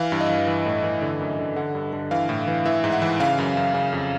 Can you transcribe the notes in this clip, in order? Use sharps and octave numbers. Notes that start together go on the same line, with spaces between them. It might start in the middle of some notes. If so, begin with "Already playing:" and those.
Already playing: E3 F5
G2
D#5
E3
E3
A2
E3
D3
F#2
D3
D3 F#5
G2
D3
E3 F5
A2
E3
E3 E5
G#2
F#5
E3
C#3 F5
F#2
F#2
C#3 F5
F2